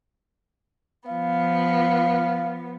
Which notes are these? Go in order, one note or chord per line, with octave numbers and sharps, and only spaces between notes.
F3 B3 F5